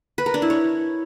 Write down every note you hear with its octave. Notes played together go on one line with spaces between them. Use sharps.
B4
A#4
D4
E4
C#5